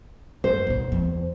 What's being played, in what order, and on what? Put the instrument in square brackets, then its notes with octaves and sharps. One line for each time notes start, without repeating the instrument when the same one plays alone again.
[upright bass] F#2 [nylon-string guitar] C5
[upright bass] B1 B3
E2